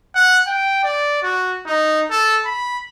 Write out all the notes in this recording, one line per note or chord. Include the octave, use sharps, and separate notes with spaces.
F#5
G5
D5
F#4
D#4
A4
B5